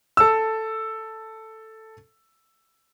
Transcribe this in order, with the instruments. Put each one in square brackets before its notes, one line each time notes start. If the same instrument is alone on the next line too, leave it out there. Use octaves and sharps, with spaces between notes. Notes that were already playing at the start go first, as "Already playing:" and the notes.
[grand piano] A4 E6